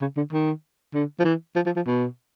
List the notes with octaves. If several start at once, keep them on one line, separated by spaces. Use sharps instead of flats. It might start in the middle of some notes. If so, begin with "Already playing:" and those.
C#3
D3
D#3
D3
F3
E3
F3
F3
F3
B2